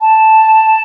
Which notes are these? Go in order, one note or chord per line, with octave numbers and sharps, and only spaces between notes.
A5